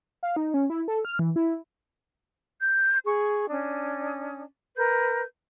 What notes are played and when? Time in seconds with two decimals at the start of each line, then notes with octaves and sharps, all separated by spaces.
0.23 F5
0.36 D#4
0.54 C#4
0.70 E4
0.88 A4
1.05 F6
1.19 E3
1.36 E4
2.61 G6
3.05 G#4 C#6
3.49 C#4 D4 D#6
4.76 A#4 B4 G6